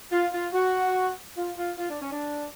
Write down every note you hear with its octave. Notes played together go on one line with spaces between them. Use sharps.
F4
F4
F#4
F4
F4
F4
D4
C#4
D4